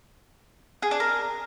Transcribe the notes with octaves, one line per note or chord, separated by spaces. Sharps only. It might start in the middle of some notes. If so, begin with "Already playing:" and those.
G#4
D4
A#4